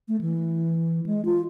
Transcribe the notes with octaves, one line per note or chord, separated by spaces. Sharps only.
A3
E3
G#3
F4